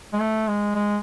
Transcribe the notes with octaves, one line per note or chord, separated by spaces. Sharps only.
G#3
A3
G#3
G#3